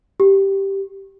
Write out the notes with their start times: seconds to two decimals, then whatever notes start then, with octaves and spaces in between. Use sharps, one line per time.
0.20 G4